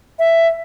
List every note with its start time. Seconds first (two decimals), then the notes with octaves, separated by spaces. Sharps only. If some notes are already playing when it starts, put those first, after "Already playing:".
0.19 E5